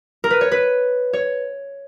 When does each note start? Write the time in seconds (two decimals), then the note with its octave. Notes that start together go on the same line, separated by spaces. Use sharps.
0.24 A#4
0.30 B4
0.41 C#5
0.51 B4
1.13 C#5